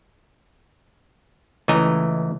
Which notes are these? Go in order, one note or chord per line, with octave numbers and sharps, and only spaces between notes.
C#2 E3 A3 D#5 G#5 A#5